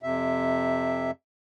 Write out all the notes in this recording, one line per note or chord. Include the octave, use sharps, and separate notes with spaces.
F2 C3 E5